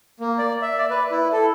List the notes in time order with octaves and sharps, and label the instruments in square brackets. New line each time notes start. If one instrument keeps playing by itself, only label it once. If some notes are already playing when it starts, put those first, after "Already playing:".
[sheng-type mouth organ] A#3
D5
E5
D5
B4
E4
A4